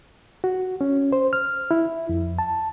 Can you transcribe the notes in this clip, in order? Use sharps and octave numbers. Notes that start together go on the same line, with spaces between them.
F#4
C#4
C5
F6
E4
F2
A5